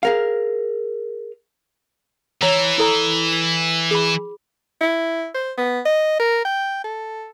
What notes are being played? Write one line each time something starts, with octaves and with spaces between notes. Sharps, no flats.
G#4 A#4 F5
E3 C#5 A#5
E4 A4 A#5
G#4 B5
E4
C5
B3
D#5
A#4
G5
A4